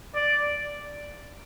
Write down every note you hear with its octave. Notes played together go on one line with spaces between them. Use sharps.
D5